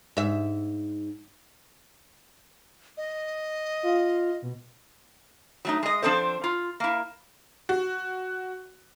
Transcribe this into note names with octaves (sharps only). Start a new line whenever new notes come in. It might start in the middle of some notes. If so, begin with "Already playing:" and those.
G#2 E5
D#5
F4
B2
F#3 A3 D#4
G#3 D#5
F3 C4 D4 A4 C5
F4
A#3 E4
F#4